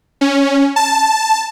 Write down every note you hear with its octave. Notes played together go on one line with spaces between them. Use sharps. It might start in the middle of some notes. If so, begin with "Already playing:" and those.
C#4
A5